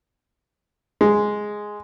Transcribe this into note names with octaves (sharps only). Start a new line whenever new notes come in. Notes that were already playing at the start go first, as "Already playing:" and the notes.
G#3